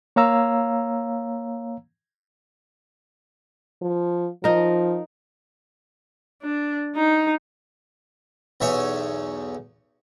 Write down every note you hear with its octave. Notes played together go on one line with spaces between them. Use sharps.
A#3 C#5 F5 A#5 E6
F3
F3 D#4 A#4
D4
D#4
B1 E2 C#5 E5 G#5